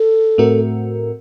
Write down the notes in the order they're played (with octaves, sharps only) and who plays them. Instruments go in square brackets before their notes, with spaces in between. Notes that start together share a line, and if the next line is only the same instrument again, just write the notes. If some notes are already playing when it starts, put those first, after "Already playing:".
Already playing: [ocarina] A4
[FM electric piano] A2 A3 C4 F#4 A#4